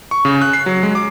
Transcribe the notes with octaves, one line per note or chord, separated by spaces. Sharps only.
C#6
C#3
F#6
C7
F#3
G#3
D6